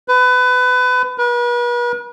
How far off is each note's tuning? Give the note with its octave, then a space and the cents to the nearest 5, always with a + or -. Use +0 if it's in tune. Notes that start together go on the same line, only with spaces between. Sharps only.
B4 +25
B4 -40